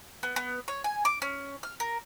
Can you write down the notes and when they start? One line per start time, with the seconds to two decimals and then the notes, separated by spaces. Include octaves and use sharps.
0.23 B3
0.36 B3
0.68 C#5
0.84 G#5
1.05 D6
1.22 C#4
1.63 F6
1.80 A#4